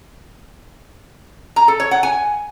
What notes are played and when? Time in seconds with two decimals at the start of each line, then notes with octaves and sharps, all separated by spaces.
1.56 A#5
1.68 A4
1.80 C#5
1.91 F#5
2.03 G#5